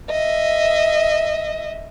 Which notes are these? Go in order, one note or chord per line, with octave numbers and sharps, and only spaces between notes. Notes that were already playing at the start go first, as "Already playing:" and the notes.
D#5 E5